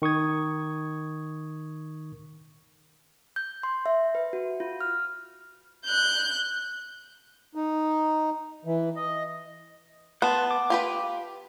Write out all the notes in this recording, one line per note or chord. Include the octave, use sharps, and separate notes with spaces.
D#3 C#6 D#6 G#6
G6
C6
E5
B4
F#4
F4
F6
F#6 G6
D#4
E3
D#5
B3 A5 C6 F#6
D6
F4 G4 B4